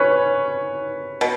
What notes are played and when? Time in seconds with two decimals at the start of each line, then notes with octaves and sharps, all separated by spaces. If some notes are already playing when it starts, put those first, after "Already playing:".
Already playing: C#4 B4 C#5
1.21 B2